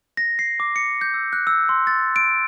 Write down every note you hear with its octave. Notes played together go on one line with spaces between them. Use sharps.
A#6
C7
D6
C#7
G6
E6
F#6
E6
C6
A6
D7